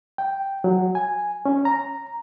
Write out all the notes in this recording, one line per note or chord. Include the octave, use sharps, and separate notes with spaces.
G5
F#3
G#5
C#4
A#5